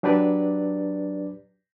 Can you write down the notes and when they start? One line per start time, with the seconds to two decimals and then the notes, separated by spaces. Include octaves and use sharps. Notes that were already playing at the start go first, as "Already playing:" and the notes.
0.03 F#3 D4 G4 B4 D5